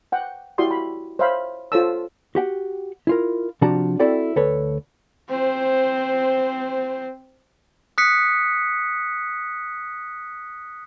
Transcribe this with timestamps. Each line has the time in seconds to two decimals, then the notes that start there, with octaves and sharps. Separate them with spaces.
0.12 F#5 G5
0.58 E4 F#4 G4 D5 C6 D#6
0.71 B5
1.19 C5 C#5 E5 F5 B5
1.72 F4 A4 C5 C#5 A5 E6
2.35 F#4 G4 F#5 G5
3.07 E4 F4 A#4
3.61 C3 F3 D4 F#4 A5 A#5
3.99 C4 E4 F#4 A4 D5 G5
4.36 D2 A4 B4 C#5
5.29 C4 C5
7.98 D#6 F#6 B6 C#7